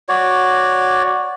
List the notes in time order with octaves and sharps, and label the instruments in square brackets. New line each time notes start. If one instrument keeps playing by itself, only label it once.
[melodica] F#4 C#5 D5